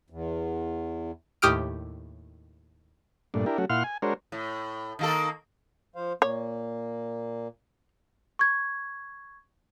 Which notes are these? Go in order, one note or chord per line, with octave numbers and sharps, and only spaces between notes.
E2
D#2 A2 G4 D#6 F6 D7
G2 A#2 A3 D4
D4 E4 G4 A#4
F#3 A3 C#4 F#4
A#2 E4 F5 F#5 C6 F6
G#5
G#3 D4 F#4 A#4 C5 C#5
A2
D#3 A#3 A4
F3 C5 F5
A#2 A#3 C#5
C#6 G#6